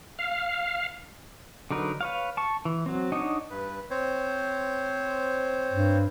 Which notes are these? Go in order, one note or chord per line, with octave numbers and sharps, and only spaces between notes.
F5
D3 F#3 D#4 A#4 B4
B4 C#5 F5
A5 C#6
E3
F#3 C4
D4 D#4 C#5 D#5 F#5
G2 B4
C4 C5 C#5
G2